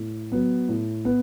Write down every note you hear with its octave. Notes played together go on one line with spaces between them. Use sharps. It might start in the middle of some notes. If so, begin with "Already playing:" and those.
Already playing: A2
F#3 B3
A2
B3